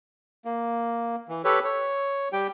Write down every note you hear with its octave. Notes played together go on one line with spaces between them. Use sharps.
A#3
E3
G4 A4 B4 C#5
C#5
G3 G4 G5